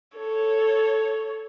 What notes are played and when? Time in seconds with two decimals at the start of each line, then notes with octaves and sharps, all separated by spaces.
0.16 A4 C#5